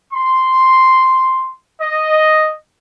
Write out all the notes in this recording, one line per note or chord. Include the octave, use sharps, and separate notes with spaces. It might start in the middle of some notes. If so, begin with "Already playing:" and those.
C6
D#5